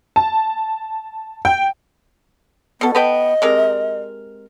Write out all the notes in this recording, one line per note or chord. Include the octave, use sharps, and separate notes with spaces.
A5
G5
B2 B3 A4
B3 B4 D#5 G5
C3 G#3 A#4